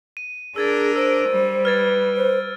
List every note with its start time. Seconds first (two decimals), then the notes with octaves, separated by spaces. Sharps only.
0.17 D#7
0.56 D4 G#4 A#4 E6 G#6 A6
0.96 C5 E6 D7
1.29 G3
1.65 B4 F6 G#6 A6
2.16 C5